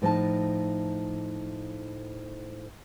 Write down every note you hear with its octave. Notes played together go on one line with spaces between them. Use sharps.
A2 F3 D#4 A5